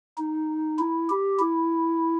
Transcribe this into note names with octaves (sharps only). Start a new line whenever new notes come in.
D#4
E4
G4
E4